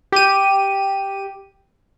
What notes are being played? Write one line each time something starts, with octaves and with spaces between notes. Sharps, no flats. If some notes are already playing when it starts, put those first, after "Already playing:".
G4 D#7